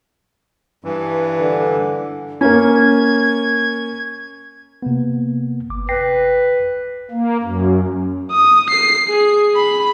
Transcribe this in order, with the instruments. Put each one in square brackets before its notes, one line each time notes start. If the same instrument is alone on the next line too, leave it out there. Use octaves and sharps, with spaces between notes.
[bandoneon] G2 E3
[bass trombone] D3
[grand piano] A#3 C#4 [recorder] G#6
[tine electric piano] C3 A#3 B3
G1 D6
[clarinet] B4 [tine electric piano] G5 A#6 C7
[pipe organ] A#3
F#2
[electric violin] D#6
C7
G#4
B5